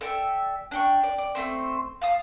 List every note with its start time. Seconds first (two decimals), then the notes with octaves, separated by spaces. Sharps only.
0.01 A4 D5 E5 G5
0.71 D4 G5 C#6
1.04 D5
1.18 D5
1.35 A3 C4 C5
2.02 F5 A5 D#6